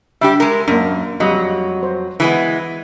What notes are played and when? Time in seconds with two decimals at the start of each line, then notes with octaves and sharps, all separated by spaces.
0.21 G3 D4 G4 E5
0.40 G#3 A#4
0.68 F#2 A#3 D4
1.20 F2 F#3 G3 D#5
1.83 C5
2.20 E3 G#3 B3